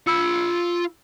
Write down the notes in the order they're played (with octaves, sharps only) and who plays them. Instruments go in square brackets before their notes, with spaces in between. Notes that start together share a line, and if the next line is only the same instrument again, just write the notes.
[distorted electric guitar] F4 B5 [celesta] E6 C#7